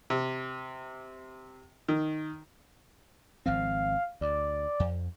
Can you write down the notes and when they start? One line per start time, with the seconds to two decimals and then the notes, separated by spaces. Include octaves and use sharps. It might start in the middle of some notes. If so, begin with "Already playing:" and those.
0.10 C3
1.88 D#3
3.46 G#1 F3 C4 F5
4.21 D2 D5
4.80 F2